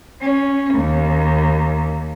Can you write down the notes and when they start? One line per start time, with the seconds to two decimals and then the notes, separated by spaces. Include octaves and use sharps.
0.21 C#4
0.75 D#2